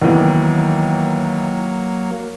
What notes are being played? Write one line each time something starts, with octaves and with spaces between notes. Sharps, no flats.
D#2 E3 F#3 A#3 B3